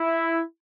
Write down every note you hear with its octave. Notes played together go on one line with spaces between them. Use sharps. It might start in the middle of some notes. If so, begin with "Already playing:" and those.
Already playing: E4